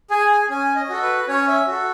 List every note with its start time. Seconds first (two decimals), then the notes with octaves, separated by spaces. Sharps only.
0.10 G#4 G#5
0.31 G#5
0.49 C#4 G#5
0.75 D#5
0.89 F#4 A4
1.02 B4
1.28 C#4 C#5
1.48 E5
1.67 F#4 A4